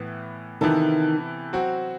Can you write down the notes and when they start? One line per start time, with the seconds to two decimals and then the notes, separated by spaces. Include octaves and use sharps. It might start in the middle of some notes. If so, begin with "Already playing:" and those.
Already playing: A2 E3 B3
0.61 C3 D#3 E3 B3 E4 A4
1.53 F#3 C4 F#4